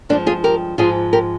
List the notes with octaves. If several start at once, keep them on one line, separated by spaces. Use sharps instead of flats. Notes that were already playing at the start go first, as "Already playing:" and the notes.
G2 F3 G#3 A#3 D4
F4 G#4
G4 A#4
G#2 F3 G#3 F4 G#4
G4 A#4